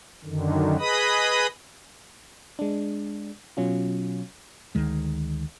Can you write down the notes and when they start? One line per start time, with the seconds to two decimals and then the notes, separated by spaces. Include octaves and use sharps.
0.24 F#2 D3 D#3
0.79 G#4 B4 D#5 B5 D#6
2.59 G#3 D4
3.57 B2 F#3 C#4 F4
4.75 D2 D#3 G#3